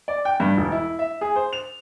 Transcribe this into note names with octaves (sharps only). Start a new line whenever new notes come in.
D5
G5
G2
E1
E4
E5
G#4
C5
F7